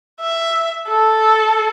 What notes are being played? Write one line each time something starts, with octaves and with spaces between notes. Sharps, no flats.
E5
A4